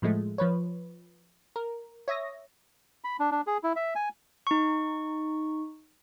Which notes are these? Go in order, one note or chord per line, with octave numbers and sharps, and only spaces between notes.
A2 F3 G#3 A3
F3 B4 C#5
A#4
C#5 E5 D#6 A#6
B5
D4
D4
G#4
E4
E5
G#5
D#4 C#6